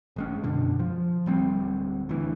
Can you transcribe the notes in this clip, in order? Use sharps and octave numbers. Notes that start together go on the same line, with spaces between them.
G#1 G#3 C#4
F#2 B2 D3
F3
D1 G3 C4
D2 E3